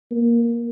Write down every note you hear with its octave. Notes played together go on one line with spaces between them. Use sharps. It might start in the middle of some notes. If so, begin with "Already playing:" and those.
A#3